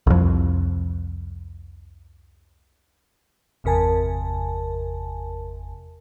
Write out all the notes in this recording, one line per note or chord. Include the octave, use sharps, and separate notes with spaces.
C2 F2
G1 E2 C3 A#4 G#5 A5